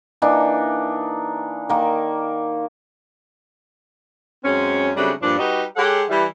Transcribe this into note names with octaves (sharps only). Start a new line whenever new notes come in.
E3 A#3 D4 D#4
D#3 A#3
F#2 G#3 C4 C#4
C#3 F#3 G3 A3 C4 D4
G2 A#2 F3 D4
G3 D#4 F#4 G4 B4 D#5
G#3 G4 A4 C#5 F#5
E3 G3